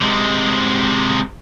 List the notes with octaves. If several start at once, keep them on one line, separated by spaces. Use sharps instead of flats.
C3 G#3